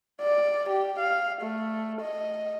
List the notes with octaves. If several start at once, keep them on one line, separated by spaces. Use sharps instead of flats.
D5
G4
F5
A3
D#5